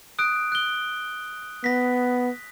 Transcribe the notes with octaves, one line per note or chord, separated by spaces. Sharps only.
D#6 F#6 D7
F#6 G7
B3 A#6 B6